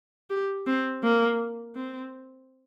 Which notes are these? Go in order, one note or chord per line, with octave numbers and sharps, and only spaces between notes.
G4
C4
A#3
C4